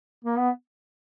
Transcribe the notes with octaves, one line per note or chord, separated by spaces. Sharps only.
A#3
B3